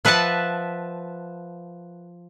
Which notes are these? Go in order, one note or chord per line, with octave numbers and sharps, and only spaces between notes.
F3 B4 E5 F#5 A5